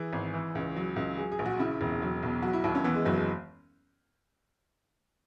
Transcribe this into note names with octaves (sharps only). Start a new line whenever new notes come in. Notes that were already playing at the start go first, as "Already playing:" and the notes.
Already playing: E3 G#4
G#1
E3
C#2
F#3
C#2
F#3 G#4
G#4
A#1
F#4
C#3 E4
E1
F#3
B1
F#3 F#4
E4
D#2 E4
C#4
E3 B3
G#3
F#1 F#3
G#3